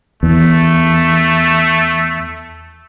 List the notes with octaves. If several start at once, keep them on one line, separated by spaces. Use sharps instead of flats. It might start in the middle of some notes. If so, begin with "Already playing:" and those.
E2 A3